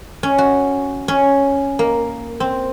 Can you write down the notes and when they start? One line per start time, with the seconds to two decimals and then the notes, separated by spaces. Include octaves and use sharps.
0.23 C#4
0.38 F#4
1.08 C#4
1.79 A#3
2.40 C4